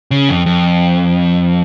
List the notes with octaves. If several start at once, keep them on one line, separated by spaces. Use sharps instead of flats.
C#3
F2
F2